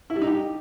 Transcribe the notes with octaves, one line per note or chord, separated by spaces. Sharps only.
E4
G3
D#4
G4